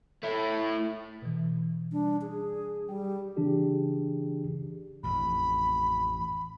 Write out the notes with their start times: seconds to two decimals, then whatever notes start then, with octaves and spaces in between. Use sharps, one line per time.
0.23 A3 E4
1.22 B2 E3
1.92 G3 D4
2.22 G#4
2.89 G3 G5
3.36 C#3 E3 D4 G4 G#4
5.03 A1 F2 B5